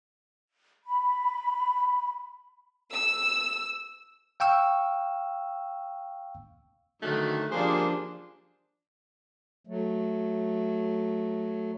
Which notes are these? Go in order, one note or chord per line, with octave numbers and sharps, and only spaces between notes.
B5
E6
F5 G5 C#6 E6
D3 D#3 F#3 A3
F3 G3 A#3 D4 G#4 C5
F#3 A3